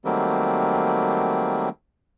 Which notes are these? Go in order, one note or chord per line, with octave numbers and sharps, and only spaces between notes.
D#3 F#3 G3 A3 A#3 C4